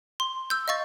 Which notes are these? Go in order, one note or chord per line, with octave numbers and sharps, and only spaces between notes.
C6
E6 G6
D#5 F5 C#6 A6